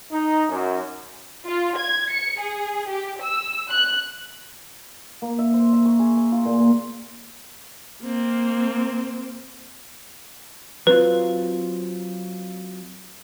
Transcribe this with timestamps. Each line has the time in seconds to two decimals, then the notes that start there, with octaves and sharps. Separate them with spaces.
0.12 D#4
0.50 F#2
1.47 F4
1.78 G#6
2.12 C#7
2.41 G#4
2.89 G4
3.22 E6
3.71 F#6
5.22 A#3
5.38 E5
5.54 C5
5.73 E5
5.85 C#6
5.99 G#4
6.17 G#5
6.32 F4
6.45 A#2
6.60 A#3
8.02 A#3 C4
10.87 F#3 C4 F4 B4